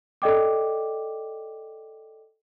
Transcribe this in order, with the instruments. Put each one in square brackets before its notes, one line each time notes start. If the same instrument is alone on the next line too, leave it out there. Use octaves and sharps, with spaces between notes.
[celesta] A4 D5 D#5 G5 D6